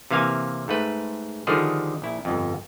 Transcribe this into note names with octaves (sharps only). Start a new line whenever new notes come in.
C3 E3 A#3 F5 G#5
G#2 A3 B4
D3 D#3 F3 G3 G#4 A4
A#1 E4
G1 F2